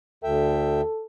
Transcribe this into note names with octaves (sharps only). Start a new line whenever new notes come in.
D2 A4 E5 G5